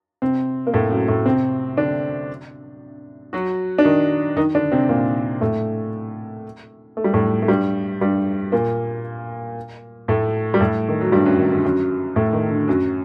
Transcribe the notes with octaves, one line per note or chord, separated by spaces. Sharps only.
C3 C4
A#3
A2 A3
F#2 F#3
A2 A3
C3 C4
D3 D4
F#3 F#4
D4
D#3 D#4
D#3 D#4
D3 D4
C3 C4
A#2 A#3
A2 A3
A3
G3
A2 A3
A3
G2 G3
G2 G3
A#2 A#3
A2 A3
G3
A2 A3
D#3
F#3
G2 G3
F#2 F#3
D#3
D3
F#2 F#3
A2 A3
D#3
D3
F#2 F#3